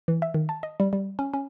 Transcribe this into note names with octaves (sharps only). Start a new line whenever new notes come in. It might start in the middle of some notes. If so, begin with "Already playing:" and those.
E3
E5
D#3
A5
D#5
G3
G3
C#4
C#4